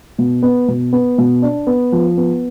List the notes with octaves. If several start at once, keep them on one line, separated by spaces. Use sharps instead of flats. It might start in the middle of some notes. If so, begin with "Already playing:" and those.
B2
B3
B2
B3
B2
D4
B3
F3
B3